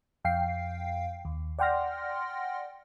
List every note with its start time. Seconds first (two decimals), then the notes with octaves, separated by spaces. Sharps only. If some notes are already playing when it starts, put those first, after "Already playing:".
0.24 F2 F5 G5 C7
1.25 D#2
1.59 D5 F#5 G5 C6 F6 A#6